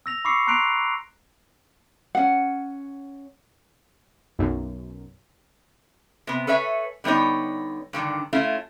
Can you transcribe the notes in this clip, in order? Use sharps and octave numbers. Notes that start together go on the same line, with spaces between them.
E6 A#6 F7
B5 C#6 D6 E6 C7 C#7
A#5 C6 F#6 C7 D7 F7
C#4 F#5
B1 F#2
C3 B3
A4 B4 C#5 E5 G#5
D3 G3 B3 D#4 C#5
G2 D3 D#3
A3 C#4 E4 F4